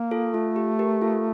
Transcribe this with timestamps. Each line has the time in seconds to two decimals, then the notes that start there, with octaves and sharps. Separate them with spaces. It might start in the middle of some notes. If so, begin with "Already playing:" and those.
Already playing: A#3
0.11 F4 A4
0.34 A3 F4
0.56 G4
0.79 G4 A#4
1.01 F4 A4